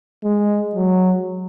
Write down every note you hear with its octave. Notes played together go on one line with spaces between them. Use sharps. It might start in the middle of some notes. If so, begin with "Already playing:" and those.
G#3
F#3